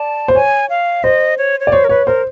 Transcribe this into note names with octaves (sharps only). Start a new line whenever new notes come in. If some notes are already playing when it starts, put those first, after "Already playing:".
Already playing: D5 A5
C5
C#5 G#5
F5
C5 D#5
C#5
C#5
D5
C5 C#5
A#4
B4 C#5
A#4 C5